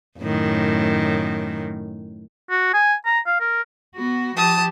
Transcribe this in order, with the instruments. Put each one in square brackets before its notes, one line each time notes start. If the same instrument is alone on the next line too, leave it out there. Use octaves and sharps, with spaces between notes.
[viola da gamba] F#2 A2 D#3
[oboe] F#4
G#5
A#5
F5
A#4
[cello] B3 F#4
[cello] F3 G4 [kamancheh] A5 D#6